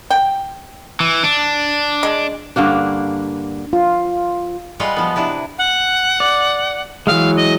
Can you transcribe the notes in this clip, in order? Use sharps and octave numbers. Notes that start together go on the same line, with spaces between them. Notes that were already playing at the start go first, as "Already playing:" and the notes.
G5
E3
D4
G#3
G2 D3 A#3 D4
F4
G3 G#3 F4 B4 F5 F#5
F3 B3
C3 D4 E4 B4
F#5
D5
E3 F#3 G#3 F5
D#5